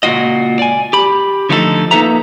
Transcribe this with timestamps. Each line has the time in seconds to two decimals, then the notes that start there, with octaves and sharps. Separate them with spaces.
0.03 C#2 A#2 G#3 F4 F#4 D#5
0.59 D5 G#5
0.93 G4 B5
1.49 D3 F3 A3 D#4 F4 A4
1.91 A#3 D#4 A4 B4 E5 A#5